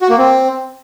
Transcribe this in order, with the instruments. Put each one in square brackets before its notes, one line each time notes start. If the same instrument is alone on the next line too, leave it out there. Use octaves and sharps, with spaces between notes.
[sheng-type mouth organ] F#4
A#3
C4